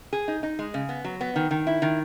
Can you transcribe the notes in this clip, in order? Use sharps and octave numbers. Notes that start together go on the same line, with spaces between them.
G#4
D#4
D#4
G#3
C#3
B3
F#3
B3
D#3
D#3
E4
D#3